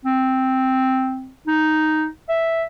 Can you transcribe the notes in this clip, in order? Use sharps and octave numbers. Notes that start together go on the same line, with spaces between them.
C4
D#4
E5